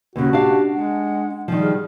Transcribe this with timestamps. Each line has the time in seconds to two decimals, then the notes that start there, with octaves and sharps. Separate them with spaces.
0.16 D#2 C#3 F#4
0.33 D4 G4 F5 A5
0.74 G#3 F#5
1.48 D#3 F3 G3
1.61 G#4 F6